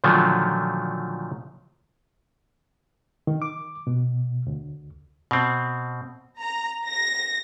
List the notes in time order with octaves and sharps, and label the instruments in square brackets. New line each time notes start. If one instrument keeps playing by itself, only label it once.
[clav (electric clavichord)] A#2 D3 D#3 F3 F#3 A3
[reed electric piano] D#3
D6
B2
D2
[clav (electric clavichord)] B2 C4
[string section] A#5
A#6